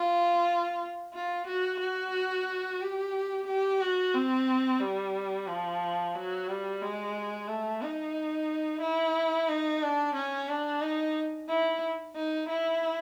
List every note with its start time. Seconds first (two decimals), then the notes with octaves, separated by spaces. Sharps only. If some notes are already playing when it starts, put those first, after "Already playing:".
Already playing: F4
1.15 F4
1.47 F#4
1.80 F#4
2.81 G4
3.47 G4
3.81 F#4
4.15 C4
4.81 G3
5.48 F3
6.15 F#3
6.48 G3
6.82 G#3
7.48 A3
7.82 D#4
8.81 E4
9.49 D#4
9.83 D4
10.16 C#4
10.49 D4
10.82 D#4
11.49 E4
12.16 D#4
12.49 E4